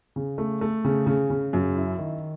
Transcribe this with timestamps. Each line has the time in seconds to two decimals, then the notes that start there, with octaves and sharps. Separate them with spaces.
0.16 C#3
0.38 A3
0.61 A3
0.84 C#3
1.07 C#3
1.30 C#3
1.53 F#2
1.75 E4
1.98 D#3